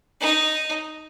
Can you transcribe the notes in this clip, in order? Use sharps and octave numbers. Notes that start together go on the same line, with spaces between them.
D#4